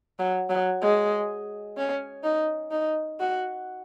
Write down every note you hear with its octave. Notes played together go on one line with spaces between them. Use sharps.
F#3
F#3
G#3
C#4
D#4
D#4
F#4